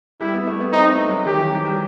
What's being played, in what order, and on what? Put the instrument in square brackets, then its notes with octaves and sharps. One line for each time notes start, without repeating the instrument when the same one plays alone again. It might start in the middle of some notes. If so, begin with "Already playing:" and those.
[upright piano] G3 [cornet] E4
[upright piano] B3
A3
B3
[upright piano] C4 [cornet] D#4
[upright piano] A3
F#3
[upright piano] D#3 [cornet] G4
[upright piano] E3
F#3
G3